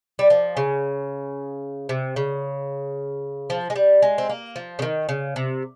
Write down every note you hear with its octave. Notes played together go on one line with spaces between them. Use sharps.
G3
F3
C#3
C3
C#3
F3
G#3
G3
G#3
C4
A#3
F3
C#3
D#3
C#3
C3